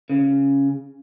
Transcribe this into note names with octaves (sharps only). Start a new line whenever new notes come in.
C#3